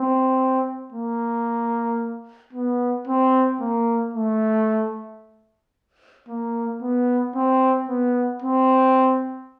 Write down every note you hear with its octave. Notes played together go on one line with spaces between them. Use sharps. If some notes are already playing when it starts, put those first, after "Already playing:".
Already playing: C4
A#3
B3
C4
A#3
A3
A#3
B3
C4
B3
C4